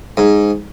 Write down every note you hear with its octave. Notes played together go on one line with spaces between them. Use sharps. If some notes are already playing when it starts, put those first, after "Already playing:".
G#2